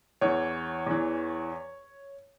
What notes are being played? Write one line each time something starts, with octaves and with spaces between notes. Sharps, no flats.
E2 E3 C#5
E2 E3